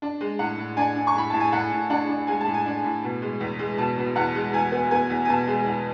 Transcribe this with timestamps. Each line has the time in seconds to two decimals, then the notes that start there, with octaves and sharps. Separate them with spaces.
0.02 D4
0.21 G#3
0.39 A2 F#5
0.58 A2
0.77 D4 G#5
0.96 D4
1.07 C#6
1.15 A2 B5
1.30 A2 A5
1.40 G#5
1.53 A2 F#5
1.72 A2
1.90 D4 F#5
2.09 D4
2.27 G#3 G#5
2.41 A5
2.46 A2
2.54 G#5
2.66 D4
2.84 A2
3.04 B2
3.22 G#3
3.41 E2
3.59 G#3
3.78 B2 A5
3.98 B2
4.16 E2 F#5
4.35 G#3
4.53 E2 G#5
4.72 B3
4.91 B3 G#5
5.10 E2
5.25 G#5
5.29 B2 A5
5.47 G#3
5.66 E2